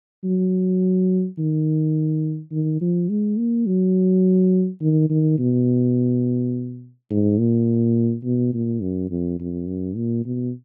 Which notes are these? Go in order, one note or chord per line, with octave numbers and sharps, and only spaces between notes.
F#3
D#3
D#3
F3
G#3
A#3
F#3
D#3
D#3
B2
G#2
A#2
B2
A#2
F#2
F2
F2
F#2
A#2
B2